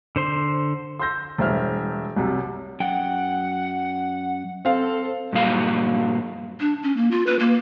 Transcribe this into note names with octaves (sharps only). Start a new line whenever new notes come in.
D3 C5 C6
C6 E6 G6 A#6
E1 G2 C5 E5 F6
C2 F#2 C3
F#2 F#5 G5
C4 A4 F5
G2 A#2 F#3 F5
D4
C#4
A#3
F4
B4
A#3